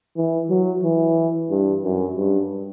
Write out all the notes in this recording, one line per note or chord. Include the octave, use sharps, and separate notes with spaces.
E3
F#3
E3
G2
F#2
G2